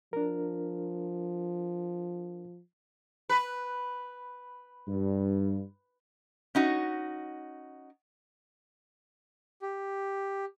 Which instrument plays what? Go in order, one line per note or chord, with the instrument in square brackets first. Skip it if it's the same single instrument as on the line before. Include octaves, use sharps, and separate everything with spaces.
[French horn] F3 [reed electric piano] D4 A#4
[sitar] B4
[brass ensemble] G2
[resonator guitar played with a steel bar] C#4 D#4 F#4
[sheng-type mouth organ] G4